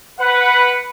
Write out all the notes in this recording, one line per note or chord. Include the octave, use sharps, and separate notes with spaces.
B4 F#5